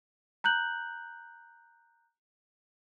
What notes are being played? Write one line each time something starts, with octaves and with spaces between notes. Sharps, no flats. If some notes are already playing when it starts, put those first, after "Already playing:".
A#5 F#6 G6 F#7